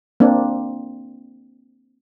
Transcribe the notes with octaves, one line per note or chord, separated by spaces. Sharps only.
A#3 C4 D4